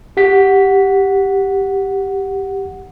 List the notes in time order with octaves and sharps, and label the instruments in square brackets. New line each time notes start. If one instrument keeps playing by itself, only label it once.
[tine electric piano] G4 F#5 B6